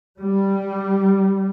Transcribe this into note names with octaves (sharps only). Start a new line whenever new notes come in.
G3